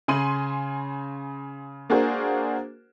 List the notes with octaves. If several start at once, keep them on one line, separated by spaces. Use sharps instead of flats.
C#3 G#5 C6 D#7 F#7
A#3 D4 F#4 G#4 A#4 C5